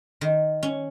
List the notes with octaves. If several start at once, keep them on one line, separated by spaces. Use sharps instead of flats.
D#3
C#4